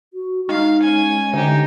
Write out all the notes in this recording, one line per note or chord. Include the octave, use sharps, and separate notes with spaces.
F#4
G#3 D#4 F5
C#4 G#5
D3 D#4 G4